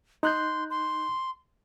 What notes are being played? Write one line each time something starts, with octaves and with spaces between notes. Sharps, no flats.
D#4 C6 F#6 G6
C6